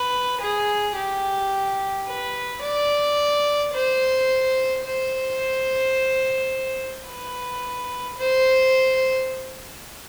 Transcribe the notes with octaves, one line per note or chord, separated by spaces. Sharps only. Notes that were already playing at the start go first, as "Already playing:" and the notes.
Already playing: B4
G#4
G4
B4
D5
C5
C5
B4
C5